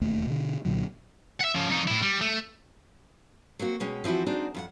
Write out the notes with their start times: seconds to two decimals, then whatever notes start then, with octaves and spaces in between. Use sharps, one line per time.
0.02 E1 D#2 A3
0.27 B2 D3
0.65 C2 A#2 D3 F#3
1.41 E5 F#5
1.55 F3 C#4
1.70 F2 D#4
1.88 A2 E4
2.02 G3
2.21 A3
3.59 F#3 A#3 C4 F#4
3.80 B2 G#3 C#4 G5
4.04 E3 F3 C4 E4 F#4
4.26 G#3 C4 D4 D#4 F#4 C5
4.55 F2 F4 F#5